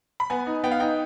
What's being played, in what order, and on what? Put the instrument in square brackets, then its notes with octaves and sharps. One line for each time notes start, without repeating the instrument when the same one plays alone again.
[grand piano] B5
B3 G#5
D#4
B3 G5
F5
D#4 G5